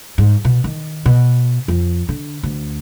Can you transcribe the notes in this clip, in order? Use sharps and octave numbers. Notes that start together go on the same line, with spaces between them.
G#2
B2
D#3
B2
F2
D3
D2